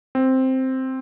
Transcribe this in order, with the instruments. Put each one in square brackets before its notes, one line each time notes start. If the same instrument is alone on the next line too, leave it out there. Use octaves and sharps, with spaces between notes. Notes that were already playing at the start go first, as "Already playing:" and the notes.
[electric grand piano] C4